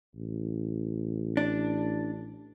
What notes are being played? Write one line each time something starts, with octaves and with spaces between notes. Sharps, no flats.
A1
D4